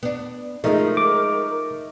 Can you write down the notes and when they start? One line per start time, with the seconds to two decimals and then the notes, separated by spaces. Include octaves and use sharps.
0.03 B3 D4
0.64 F3 G#3 A3 D#4 A#4
0.97 D6